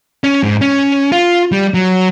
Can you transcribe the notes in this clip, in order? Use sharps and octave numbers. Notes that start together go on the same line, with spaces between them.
C#4
G#2
C#4
F4
G3
F#3